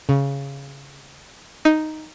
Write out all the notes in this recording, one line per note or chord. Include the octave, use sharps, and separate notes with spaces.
C#3
D#4